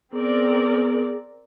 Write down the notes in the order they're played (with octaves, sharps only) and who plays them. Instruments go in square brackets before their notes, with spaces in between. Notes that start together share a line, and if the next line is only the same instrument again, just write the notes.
[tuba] B3 [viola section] C4 A#4 D5 [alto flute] G#4